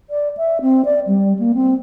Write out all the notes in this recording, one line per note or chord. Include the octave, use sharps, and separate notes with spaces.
D5
E5
C4
D5
G3
A#3
C4